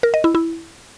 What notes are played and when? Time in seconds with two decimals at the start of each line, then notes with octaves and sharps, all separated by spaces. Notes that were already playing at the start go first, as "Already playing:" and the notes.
0.03 A#4
0.14 D#5
0.24 E4
0.35 E4